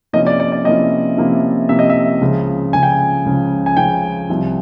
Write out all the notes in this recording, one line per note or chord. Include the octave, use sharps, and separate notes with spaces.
C3 F3 A#3 C#4 E4 D#5
D5
D5
D5
C3 F3 A#3 C#4 E4 D#5
C3 F3 A#3 C#4 E4
C3 F3 A#3 C#4 E4 E5
D#5
E5
C#2 C#3 F3
C#2 C#3 F3 G#5
G5
G#5
C#2 C#3 F3
G#5
C#2 C#3 F3 G5
C2 C3 F3